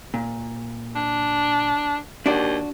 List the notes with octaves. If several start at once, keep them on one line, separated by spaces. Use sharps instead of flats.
A#2
D4
D#2 D4 F#4 D5